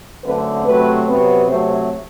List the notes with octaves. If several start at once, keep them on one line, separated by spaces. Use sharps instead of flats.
F#2 D3 A3 C4 B4
C3 F#3 A3 C4 B4
C3 F#3 B3
C3 F#3 A3 C4 C5